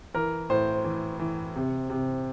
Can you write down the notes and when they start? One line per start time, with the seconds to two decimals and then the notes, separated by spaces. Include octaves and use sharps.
0.14 E3 A#4
0.50 A2 C5
0.84 E3
1.20 E3
1.56 C3
1.90 C3